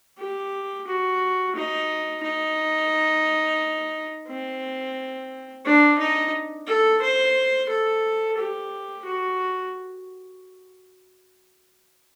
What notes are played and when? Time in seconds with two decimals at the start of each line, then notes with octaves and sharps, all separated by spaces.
0.19 G4
0.87 F#4
1.56 D#4
2.23 D#4
4.28 C4
5.65 D4
5.99 D#4
6.67 A4
7.02 C5
7.69 A4
8.38 G4
9.05 F#4